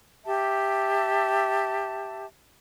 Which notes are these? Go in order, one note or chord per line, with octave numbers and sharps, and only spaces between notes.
G4 E5 A5